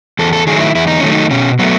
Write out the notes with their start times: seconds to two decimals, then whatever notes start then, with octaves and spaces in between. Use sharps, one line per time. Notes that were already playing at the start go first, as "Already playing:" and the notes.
0.19 E2 A4
0.33 A4
0.47 D#3 F#3 A3 G#4
0.61 E4
0.75 E2 E4
0.87 D#4
1.00 D#3 F#3 A3 C#4
1.12 D#4
1.31 B2 C#4
1.59 F#3 A3 B3